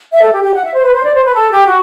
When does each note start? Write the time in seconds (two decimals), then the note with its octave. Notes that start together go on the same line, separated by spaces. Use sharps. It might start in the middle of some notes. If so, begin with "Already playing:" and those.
0.12 E5
0.22 A4
0.32 G4
0.43 G4
0.53 F#5
0.63 E5
0.74 C5
0.84 B4
0.94 C5
1.04 D5
1.14 C5
1.25 B4
1.35 A4
1.51 G4
1.66 F#4